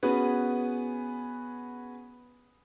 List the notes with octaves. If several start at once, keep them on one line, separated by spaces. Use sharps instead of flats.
B3 C#4 F#4 G#4 B4